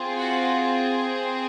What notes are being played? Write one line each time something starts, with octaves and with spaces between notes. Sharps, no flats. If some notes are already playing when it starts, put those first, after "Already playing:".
Already playing: C4 F4 G#4
F#4 F#5